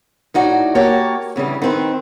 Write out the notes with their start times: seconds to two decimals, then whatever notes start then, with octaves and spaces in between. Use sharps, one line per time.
0.34 A2 D#4 F#4 D5
0.75 A#3 F#4 G4 A#4 C#5 A5
1.36 D2 C#3 E3 G3
1.62 D#3 C4 B4